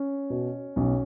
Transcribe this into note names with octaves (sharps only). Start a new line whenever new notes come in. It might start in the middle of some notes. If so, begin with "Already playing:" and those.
Already playing: C#4
B2
B1 C#4